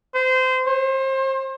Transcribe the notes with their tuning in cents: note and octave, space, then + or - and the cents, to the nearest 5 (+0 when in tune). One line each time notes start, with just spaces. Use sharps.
C5 -25
C5 +30